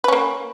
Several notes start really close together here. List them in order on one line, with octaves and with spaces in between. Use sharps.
B4 C#4 A#3